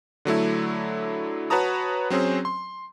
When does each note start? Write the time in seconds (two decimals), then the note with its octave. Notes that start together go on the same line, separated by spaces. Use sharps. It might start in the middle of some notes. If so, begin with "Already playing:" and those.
0.25 D3 F#3 A3 E4
1.50 F#4 B4 C#5 A5 A#5 D#6
2.10 F#3 C4 C#4 G#4 C5
2.45 C6